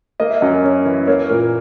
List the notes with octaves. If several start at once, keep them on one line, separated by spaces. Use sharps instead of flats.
A#3 D#5
E5
F#2 D#5
C#4
E3
A#3 C#5
A#2 A#4